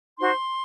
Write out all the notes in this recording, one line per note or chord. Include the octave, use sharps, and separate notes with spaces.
D#4 F#4 C5 C6